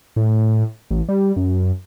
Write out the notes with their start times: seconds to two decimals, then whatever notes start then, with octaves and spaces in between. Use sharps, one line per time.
0.16 A2
0.91 A1
1.09 G3
1.36 F#2